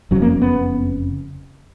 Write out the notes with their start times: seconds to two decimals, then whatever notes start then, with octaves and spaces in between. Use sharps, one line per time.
0.11 F#1 F2 C#3 F#3
0.22 A#3
0.42 B3